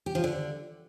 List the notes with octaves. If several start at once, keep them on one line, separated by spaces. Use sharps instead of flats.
G4
F3
D3